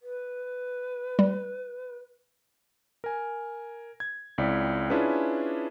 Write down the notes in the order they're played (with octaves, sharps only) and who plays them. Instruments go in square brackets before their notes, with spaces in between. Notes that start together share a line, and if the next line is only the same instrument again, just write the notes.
[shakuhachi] B4
[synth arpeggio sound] G3
[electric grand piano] A#4 G#5
G#6
C#2 C4 E4 D5 B6
C#4 D4 E4 F4 G#4 B4